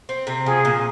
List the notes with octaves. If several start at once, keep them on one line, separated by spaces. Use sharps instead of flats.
C4
C3
F3 G#4
A#2